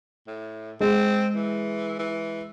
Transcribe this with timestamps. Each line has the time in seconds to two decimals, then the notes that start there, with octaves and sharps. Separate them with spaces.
0.27 A2
0.81 G#3 C4
1.35 E3
1.99 E3